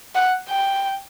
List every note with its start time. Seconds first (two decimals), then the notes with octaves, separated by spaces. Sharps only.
0.15 F#5
0.49 G5